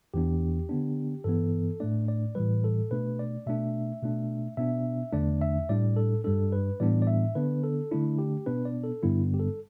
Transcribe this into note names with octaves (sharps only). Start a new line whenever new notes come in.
E2 E3 B3 D4 G4
D3 B3 D4
G2 E3 B3 A4
A2 A3 D4 D5
D5
A2 E3 G3 B4
A4
B2 A3 D4 B4
D5
B2 A3 D4 E5
B2 A3 D4
B2 B3 D4 E5
E2 D3 A3 D4 D5
E5
A2 G3 D4 D5
A4
G2 G3 D4 A4
B4
A2 E3 G3 B3 D4 D5
D5
E5
D3 B3 D4 B4
A4
D3 A3 D4 E4
G4
B2 B3 D4 B4
D5
A4
G2 D3 G3 B3 D4 E4
G4
A4